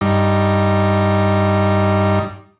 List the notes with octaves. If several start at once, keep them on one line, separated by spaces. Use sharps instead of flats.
G2 G3 D#4